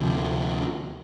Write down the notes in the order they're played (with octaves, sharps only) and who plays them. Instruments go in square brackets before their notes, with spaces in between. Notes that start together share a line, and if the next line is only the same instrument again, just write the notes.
[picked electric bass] D2 C3 F3